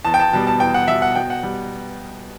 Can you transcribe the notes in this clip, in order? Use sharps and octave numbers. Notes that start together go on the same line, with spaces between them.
E2 A5
G5
A5
B2 G3 A5
A5
E2 G5
F#5
B2 G3 E5
F#5
B2 G5
F#5
G3